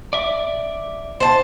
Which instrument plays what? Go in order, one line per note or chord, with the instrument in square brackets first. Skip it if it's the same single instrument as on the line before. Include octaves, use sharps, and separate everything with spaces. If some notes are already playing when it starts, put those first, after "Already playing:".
[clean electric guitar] D5 E5
[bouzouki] C5 A5